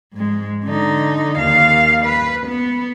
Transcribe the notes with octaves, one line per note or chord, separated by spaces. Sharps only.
G#2 G#3
D3 D#4
D#2 F5
B4
B3